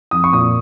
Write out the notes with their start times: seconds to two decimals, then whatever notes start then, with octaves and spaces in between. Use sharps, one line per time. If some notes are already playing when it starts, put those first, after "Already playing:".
0.11 F2 D#6
0.24 C#6
0.33 A#2 D#6